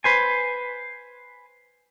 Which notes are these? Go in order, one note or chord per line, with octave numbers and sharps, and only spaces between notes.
B4 C5 G#5